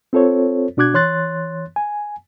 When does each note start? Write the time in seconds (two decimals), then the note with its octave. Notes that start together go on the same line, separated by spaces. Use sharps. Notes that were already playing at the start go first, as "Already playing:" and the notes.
0.13 C4 F4 A4 C5 C#5
0.77 B2 D4 F#4 D6 F#6 G#6
0.94 E3 C#5 C6 F#6 A6
1.76 G#5